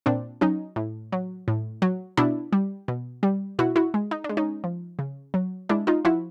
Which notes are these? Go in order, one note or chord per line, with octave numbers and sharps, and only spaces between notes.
A#2 C4 D4
F#3 C#4 D#4
A2
F#3
A2
F#3
B2 D4 E4
G3
B2
G3
B2 E4 F#4
E4 F#4
G#3
D#4
D4
G#3
C#4 D#4
F3
C#3
F#3
G#3 D4 E4
D#4 F4
F3 E4 F#4